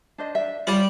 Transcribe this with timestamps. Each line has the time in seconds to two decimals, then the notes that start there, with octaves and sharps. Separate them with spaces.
0.18 D4 C5 D#5
0.35 D4 E5
0.67 G3 F4 D5